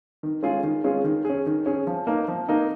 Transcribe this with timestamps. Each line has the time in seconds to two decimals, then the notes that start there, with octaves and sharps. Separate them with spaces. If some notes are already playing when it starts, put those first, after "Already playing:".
0.23 D#3
0.43 G#3 C#4 F4 G#4
0.63 D#3
0.84 G#3 C#4 F4 G#4
1.04 D#3
1.25 C#4 G#4
1.46 D#3
1.66 C#4 G#4
1.87 F3
2.07 A#3 D#4
2.28 F3
2.48 A#3 D#4